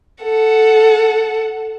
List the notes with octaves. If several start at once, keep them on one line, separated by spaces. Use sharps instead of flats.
A4 F#5